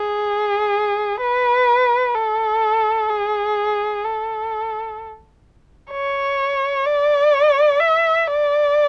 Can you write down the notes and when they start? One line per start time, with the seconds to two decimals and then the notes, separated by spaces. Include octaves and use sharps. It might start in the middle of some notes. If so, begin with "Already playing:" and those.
Already playing: G#4
1.21 B4
2.15 A4
3.10 G#4
4.04 A4
5.91 C#5
6.86 D5
7.80 E5
8.27 D5